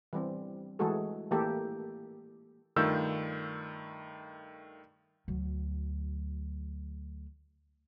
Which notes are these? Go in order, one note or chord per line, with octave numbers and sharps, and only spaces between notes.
E3 G3 C4
E3 G#3 A3 F#4 G#4 A4
E3 A3 A#3 G4 A4
G2 D#3 A3 F4 E6 G6
D2 F#3